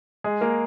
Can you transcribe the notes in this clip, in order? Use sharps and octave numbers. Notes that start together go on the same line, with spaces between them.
G#3 G#4
A#3 A#4